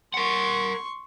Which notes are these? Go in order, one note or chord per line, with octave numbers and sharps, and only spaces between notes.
A#4 F#5 C6 C#6